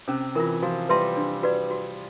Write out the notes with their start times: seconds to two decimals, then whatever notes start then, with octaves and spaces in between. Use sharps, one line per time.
0.08 C3 C#4
0.35 E3 F4 A#4
0.62 F3 F#4
0.89 G3 B4 E5 A5 C6
1.17 D4
1.43 F#4 B4 D5
1.71 F#4